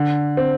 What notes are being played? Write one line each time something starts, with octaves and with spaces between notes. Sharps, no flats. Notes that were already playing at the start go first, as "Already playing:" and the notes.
Already playing: D3
C4